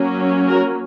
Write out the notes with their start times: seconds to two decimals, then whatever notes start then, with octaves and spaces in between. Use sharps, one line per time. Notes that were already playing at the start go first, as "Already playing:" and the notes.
Already playing: F#3 A#3 C#4
0.48 F#4 A#4